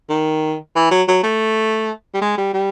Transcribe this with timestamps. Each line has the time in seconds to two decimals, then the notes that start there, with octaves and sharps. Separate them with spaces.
0.09 D#3
0.76 E3
0.91 F#3
1.08 F#3
1.23 A3
2.14 G3
2.22 G#3
2.38 G3
2.54 G3